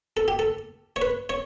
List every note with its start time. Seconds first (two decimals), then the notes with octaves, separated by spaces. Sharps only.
0.17 A4
0.28 G4
0.39 A4
0.96 C#5
1.02 B4
1.29 C#5